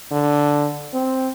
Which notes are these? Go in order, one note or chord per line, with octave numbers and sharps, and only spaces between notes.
D3
C4